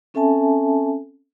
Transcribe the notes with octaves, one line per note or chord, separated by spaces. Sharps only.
C4 C#4 A4 E5 G#5 A5